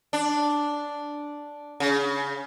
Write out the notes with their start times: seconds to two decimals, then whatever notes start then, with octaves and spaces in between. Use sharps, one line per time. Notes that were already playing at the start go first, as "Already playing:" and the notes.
0.13 D4
1.80 C#3